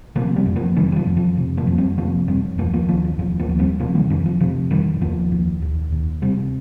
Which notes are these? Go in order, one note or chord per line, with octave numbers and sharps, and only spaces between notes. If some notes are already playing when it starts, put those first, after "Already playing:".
C3 F3 A#3
G3 C4
F2
F3 A#3
C3 D#3 G3
G3
F3
F2
F3
C3
F3 A#3
F2
G3 C4
C3 F3 A#3
F2 G3 C4
D#2 F3 A#3
F3 A#3
D#2 F3
F3
D#2 F3
F3 A#3
D#2
G3 C4
C3 F3 A#3
D#3 G3
F2 D#3
F3
C3 F3
F2 D#3 G3
D#2 F3 A#3
D#2
D#2
D#2
C3 G3 C4